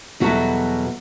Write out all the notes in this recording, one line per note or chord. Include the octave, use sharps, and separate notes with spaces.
E2 B2 F#3 G3 F#4 A4